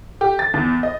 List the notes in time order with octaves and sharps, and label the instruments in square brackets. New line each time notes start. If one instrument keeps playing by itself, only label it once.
[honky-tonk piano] G4
A6
E2
D#5